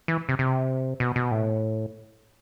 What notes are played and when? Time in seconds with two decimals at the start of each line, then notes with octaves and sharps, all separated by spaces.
0.08 E3
0.29 C3
0.39 C3
1.00 B2
1.16 B2
1.31 A2